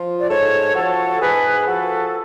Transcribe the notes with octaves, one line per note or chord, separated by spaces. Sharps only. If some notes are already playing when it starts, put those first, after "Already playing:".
Already playing: F3 F4
D5
G#2 A4 C#5
F3 F#4 A4
G#2 G#4 B4
F3 F#4 A4